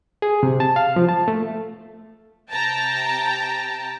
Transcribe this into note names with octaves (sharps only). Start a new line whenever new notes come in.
G#4
C3
A5
F5
F3
A5
A3
C3 G5 A5 A#5